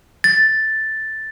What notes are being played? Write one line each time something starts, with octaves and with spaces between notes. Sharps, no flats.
A6